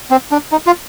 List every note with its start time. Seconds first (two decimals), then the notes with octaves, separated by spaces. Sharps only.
0.11 C4
0.31 D4
0.52 D#4
0.67 F4